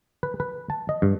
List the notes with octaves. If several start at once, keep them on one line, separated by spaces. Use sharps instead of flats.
B4
B4
A5
D#5
G2